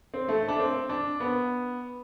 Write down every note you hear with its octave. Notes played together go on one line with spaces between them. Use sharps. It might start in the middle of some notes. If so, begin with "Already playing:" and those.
C4
A3
D4
C4
D4
B3